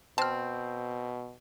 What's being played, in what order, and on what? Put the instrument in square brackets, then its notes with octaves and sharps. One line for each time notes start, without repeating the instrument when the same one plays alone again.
[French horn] B2 [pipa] C4 [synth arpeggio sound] A5 F6